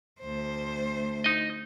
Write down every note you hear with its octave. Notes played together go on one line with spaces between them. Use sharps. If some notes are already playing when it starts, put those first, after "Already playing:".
D2 C5
D#4 D#5